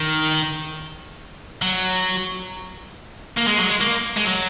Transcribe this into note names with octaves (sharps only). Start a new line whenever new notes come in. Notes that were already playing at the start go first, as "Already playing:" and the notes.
Already playing: D#3
F#3
A#3
G#3
F#3
G#3
A#3
G#3
F#3